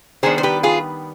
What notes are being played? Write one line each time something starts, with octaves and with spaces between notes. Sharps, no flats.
D#3 G3 B3 D4 G#4 C5
C5
G4 B4
F4 G#4